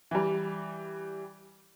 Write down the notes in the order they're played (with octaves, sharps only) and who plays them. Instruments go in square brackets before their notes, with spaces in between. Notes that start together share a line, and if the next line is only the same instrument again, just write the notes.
[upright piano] E3 G3